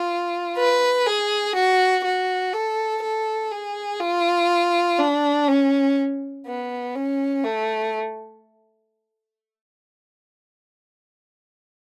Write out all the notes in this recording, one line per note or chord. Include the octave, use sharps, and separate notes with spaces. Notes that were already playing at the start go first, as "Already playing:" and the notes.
Already playing: F4
B4
G#4
F#4
F#4
A4
A4
G#4
F4
D4
C#4
B3
C#4
A3